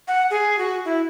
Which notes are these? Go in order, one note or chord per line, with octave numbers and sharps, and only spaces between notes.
F#5
G#4
F#4
E4